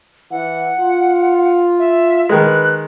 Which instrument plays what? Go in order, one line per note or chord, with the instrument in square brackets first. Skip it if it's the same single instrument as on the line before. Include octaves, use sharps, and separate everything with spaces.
[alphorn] E3 [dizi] F#5
[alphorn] F4
[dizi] E5
[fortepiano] D#3 G#3 [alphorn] B4 [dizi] F#6